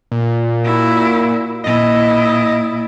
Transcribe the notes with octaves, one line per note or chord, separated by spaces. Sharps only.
A#2
E4 F#4
A#2 E4 D#5